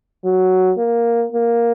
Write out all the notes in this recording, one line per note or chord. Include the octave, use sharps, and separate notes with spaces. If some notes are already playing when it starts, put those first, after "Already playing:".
F#3
A#3
A#3